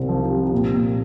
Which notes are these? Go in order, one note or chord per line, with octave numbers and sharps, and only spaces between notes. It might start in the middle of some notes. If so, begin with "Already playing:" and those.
Already playing: C2 C3 C4
F3
C3
A#2
A#2